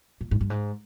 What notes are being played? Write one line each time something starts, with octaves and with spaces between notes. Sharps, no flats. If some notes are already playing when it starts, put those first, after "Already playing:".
A#2
G#2
G2
G#2